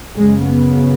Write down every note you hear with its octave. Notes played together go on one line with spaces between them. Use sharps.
F#2 C#3 G#3
B3